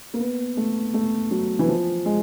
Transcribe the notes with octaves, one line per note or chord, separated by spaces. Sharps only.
A#3
B3
A3
A3
F#3
E3
F3
G#3